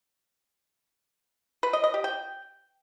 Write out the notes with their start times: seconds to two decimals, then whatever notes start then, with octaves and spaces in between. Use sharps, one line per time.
1.63 B4
1.73 D#5
1.84 D#5
1.94 G4
2.04 G5